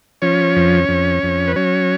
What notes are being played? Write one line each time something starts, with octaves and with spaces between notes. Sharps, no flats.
F3 C#4 C#5
F2
F2
F2
B4
F#3 C#4 C#5